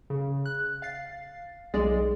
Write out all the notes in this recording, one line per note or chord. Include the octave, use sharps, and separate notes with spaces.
C#3
F#6
F5 A6 C7
B1 G#3 G#4 D5